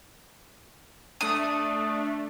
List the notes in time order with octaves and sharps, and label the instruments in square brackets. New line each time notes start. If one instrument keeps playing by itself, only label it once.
[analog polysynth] A3 D4 [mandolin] D#6